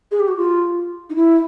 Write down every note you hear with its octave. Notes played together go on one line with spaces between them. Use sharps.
G#4
G4
F#4
F4
D#4
E4